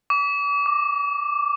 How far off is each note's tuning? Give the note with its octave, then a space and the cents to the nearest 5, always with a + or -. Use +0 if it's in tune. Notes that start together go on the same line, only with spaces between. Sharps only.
D6 -40
D6 +0